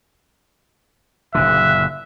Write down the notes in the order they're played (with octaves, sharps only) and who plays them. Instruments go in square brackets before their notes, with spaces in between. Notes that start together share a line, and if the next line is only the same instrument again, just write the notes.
[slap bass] F#1 A#2 D3 [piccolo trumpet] E5 [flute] F#6